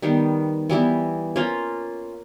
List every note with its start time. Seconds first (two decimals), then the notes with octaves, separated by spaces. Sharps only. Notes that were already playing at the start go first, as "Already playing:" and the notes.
0.02 D#3 G3 B3
0.70 E3 G3 B3 E4
1.36 A#3 C#4 F4